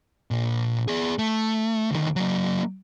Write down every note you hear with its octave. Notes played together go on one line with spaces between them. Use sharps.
A#2 D4
B3 G#4
A3
D2 D#3
F#3 A#3